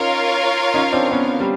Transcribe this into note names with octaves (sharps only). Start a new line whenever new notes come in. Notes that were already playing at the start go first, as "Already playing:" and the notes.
Already playing: C#4 D#4 F4 A#4 C#5 F5
C#4 D#4
C4 D4
B3 C#4
G3